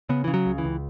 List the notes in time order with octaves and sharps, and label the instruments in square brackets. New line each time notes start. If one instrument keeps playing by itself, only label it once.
[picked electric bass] C#3 B3
C#3 E3
F#3
C#2
E3
C#2